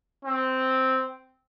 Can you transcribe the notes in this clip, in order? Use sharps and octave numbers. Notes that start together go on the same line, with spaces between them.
C4